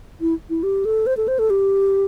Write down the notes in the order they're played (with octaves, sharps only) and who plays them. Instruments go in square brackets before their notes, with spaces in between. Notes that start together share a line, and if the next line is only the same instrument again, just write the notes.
[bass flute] E4
E4
G4
A4
C5
A4
C5
A4
G4